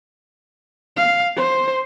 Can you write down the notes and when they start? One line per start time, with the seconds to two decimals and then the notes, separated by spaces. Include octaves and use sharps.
0.96 F5
1.36 C5